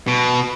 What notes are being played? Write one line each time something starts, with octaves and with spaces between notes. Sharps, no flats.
B2